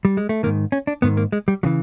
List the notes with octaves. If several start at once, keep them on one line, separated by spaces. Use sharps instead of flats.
G3
G#3
A3
G#2 D#3 A#3
C#4
D4
G#2 D#3 B3
A#3
G#3
G3
C#3 E3 F#3